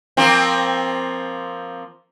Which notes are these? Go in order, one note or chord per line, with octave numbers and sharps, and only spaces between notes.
F3 A#3 C4